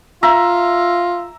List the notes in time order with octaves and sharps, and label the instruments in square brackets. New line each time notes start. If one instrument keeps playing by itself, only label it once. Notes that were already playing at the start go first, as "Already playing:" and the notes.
[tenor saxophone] F4 [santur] E5 A#5